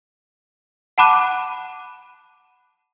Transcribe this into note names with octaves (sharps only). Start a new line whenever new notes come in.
F#5 A5 B5 D6 F#6 D#7